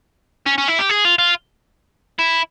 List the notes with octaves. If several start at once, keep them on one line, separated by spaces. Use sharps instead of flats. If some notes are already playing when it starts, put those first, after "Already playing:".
C#4
C#4
E4
G4
G#4
F4
F4
E4